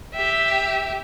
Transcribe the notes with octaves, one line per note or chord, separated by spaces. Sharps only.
G4 E5